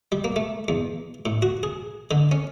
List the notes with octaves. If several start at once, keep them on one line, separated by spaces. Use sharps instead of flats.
G3
A#3
A3
E2
A2
F#4
G#4
D3
C#4